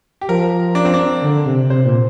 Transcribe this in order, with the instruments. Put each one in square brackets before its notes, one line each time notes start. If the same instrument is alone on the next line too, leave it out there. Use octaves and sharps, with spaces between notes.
[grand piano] G4
[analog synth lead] F3 [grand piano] A#4
[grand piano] D4
C4
D4
[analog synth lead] D3
C3
[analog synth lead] C3 [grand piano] C5
[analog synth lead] A#2